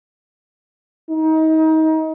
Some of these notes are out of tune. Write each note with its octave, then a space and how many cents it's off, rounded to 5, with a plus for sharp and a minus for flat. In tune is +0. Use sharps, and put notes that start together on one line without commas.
D#4 +30